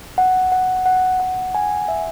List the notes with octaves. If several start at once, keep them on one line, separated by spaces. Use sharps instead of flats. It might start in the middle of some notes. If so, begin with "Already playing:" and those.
F#5
F#5
F#5
F#5
G#5
E5